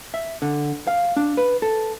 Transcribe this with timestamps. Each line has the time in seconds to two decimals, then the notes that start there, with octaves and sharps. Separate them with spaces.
0.14 E5
0.42 D3
0.87 F5
1.16 D4
1.37 B4
1.62 A4